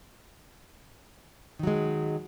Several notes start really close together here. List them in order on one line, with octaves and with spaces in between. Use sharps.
D#3 F#3 G#3